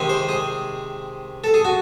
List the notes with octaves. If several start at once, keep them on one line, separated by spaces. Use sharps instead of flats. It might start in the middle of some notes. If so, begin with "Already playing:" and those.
Already playing: C3 D#3 G#3 C4
C5
G#4
A4
G#4
F#4